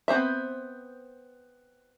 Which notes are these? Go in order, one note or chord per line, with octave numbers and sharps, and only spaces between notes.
B3 C4 C5 E5